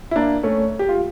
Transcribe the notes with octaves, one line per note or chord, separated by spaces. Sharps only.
E4
A#3 D4
A3 C#4
G4
F4